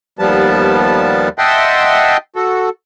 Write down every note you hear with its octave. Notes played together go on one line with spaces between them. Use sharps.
D#2 F3 G3 B3 A5
D#5 E5 F#5 G5 A5 C6
F#4 A4